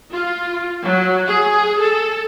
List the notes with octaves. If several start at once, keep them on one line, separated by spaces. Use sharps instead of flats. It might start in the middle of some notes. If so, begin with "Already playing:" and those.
F4
F#3
G#4
A4